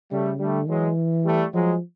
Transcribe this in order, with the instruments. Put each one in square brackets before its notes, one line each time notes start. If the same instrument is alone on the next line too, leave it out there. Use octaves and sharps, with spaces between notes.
[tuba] C#3 [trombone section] G3 A3
[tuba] D3 [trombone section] G3 A3
[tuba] E3 [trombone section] F#3 G#3
[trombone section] G3 A3
[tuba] F3 [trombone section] F#3 G#3